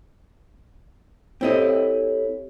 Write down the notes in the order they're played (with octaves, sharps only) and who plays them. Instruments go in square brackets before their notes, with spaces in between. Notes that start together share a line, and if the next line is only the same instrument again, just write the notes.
[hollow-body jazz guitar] C4 E4 D#5 [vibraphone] G4 A4 C#5